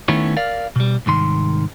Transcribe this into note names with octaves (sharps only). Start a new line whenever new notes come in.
D#3 A3 B3 C#4 E4 C#5
A#4 D5 F5
B2 G3
C2 G#2 D#3 C6